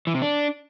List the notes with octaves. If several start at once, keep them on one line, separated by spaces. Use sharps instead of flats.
E3
C3
D4